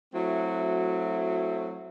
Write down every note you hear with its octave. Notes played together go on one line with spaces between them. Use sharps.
F#3 A3 C4 E4 F#4